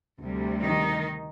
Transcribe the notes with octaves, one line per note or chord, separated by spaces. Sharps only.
D2 C3 G3
D#3 D#4